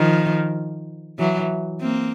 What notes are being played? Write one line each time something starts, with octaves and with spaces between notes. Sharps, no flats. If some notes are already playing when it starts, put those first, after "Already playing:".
Already playing: D#3 F3
E3 F#3
A#3 C4